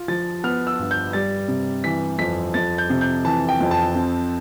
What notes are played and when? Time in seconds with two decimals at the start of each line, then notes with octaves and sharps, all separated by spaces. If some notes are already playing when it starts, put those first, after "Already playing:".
Already playing: F4
0.08 F3 A6
0.44 B3 F6
0.67 E6
0.79 G2
0.91 G6
1.13 G3 A6
1.48 C3
1.84 E3 B6
2.19 F2 B6
2.54 F2 A6
2.78 G6
2.90 C3
3.01 G6
3.24 E3 A5
3.49 G5
3.61 F2
3.71 A5
3.95 C4